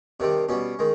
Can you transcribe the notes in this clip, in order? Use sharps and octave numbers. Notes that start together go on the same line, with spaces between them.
C3 D#3 G3 D4
B2 G3 C#4
D#3 G#3